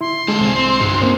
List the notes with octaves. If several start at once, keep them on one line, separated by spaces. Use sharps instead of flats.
E4 C6
D3 G#3 C#4 A4
C2 C4 G#4
C4
G2 C#4 D#4 F#4
A#3 C4 C5